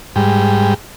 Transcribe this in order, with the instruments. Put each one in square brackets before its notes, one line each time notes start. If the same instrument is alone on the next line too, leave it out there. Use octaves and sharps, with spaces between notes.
[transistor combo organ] G#2 G3